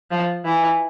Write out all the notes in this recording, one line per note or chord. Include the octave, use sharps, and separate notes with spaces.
F3
E3